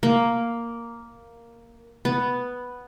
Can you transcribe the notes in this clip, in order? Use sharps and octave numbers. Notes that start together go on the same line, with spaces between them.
A#3
B3